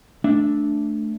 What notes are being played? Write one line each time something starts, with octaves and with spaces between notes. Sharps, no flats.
A3 D4 E5